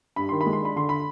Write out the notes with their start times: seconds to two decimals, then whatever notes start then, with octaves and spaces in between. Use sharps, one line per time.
0.16 G2 B5
0.29 D#3 C6
0.41 B5
0.46 G#3
0.53 C6
0.61 D4 B5
0.76 D3 C6
0.89 B5